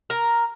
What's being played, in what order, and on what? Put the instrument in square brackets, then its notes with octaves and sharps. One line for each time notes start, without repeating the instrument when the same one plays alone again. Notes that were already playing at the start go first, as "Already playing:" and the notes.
[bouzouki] A#4